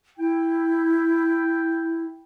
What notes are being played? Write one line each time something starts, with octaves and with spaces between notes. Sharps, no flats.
E4 G5